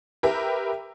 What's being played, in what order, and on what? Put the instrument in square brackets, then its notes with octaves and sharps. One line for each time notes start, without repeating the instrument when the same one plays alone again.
[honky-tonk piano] G4 A#4 B4 E5